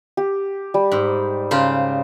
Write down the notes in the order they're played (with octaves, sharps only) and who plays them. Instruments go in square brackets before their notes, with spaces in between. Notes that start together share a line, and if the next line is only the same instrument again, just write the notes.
[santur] G4
G3
[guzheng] G#2
[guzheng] C#3 F4 C5 [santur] A#4